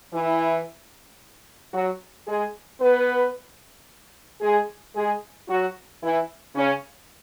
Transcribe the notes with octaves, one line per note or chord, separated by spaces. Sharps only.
E3 E4
F#3 F#4
G#3 G#4
B3 B4
G#3 G#4
G#3 G#4
F#3 F#4
E3 E4
C#3 C#4